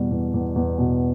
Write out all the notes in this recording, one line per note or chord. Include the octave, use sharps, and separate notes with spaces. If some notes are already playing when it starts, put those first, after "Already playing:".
Already playing: E2 B2 G3
E2
E2
E2
B2